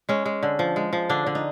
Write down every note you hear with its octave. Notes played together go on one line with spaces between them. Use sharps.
G#3 C#4
G#3
D3
F3
G#3
F3
D3 D4
D3
D#4